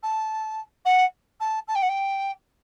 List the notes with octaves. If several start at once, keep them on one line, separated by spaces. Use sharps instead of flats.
A5
F#5
A5
A5
G5
F#5
G5